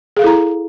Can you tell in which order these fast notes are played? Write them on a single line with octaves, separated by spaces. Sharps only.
G#4 F5 A4 E4 A#5